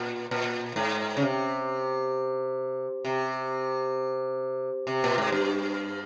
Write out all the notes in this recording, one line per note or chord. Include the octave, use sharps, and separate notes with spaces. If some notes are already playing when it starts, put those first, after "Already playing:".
Already playing: A#2
A#2
G#2
C#3
C3
C3
C3
A#2
G#2
G2